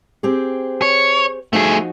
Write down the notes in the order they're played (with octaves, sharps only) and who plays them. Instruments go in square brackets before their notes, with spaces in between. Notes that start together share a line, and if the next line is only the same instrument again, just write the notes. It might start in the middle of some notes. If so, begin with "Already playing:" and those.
[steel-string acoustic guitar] C4 G4 G#4
[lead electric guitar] C#5
[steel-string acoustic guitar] F3 D#4 F#4 [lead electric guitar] A3 G#4